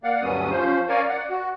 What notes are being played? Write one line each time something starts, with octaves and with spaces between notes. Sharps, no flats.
A#3 D5 F5 F#5
D2 G2 F#3 B3 C#4 D#6
F3 C#4 C5
C#4 A#4 C#5 D5 F5 G#5
D5 F#5
F#4